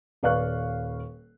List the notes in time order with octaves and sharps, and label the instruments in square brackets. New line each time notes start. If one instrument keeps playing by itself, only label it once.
[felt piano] D#1 B4 D5 F5 C#6 F#6